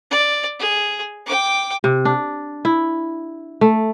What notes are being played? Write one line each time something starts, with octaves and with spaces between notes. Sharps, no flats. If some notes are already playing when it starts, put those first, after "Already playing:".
D5
G#4
G5 D6
C3
D4
E4
A3